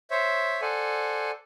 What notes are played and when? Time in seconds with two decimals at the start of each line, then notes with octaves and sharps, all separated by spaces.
0.11 C5 C#5 E5
0.62 A4 C5 D5 F#5 G#5